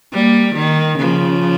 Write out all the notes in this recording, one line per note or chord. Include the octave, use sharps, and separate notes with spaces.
G3 A#3
D#3
C#3 F3